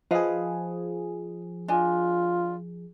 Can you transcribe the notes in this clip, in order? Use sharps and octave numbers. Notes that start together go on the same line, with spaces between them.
F3 G#4 B4 D#5 F5
D4 F4 D#5 G#5